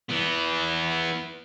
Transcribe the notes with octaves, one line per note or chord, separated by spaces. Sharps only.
E3 B3